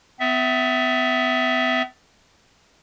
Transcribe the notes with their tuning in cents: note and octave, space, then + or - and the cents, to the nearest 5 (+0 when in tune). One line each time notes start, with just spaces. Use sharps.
B3 +40 E5 +0